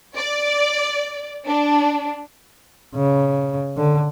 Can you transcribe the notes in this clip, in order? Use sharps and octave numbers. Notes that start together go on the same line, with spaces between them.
D5
D4
C#3
D3